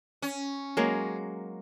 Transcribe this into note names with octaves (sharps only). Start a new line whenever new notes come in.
C#4
F#3 G#3 A#3